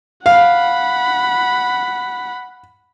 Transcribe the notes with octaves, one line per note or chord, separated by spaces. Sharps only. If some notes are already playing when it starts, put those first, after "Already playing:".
F5 F#5 B5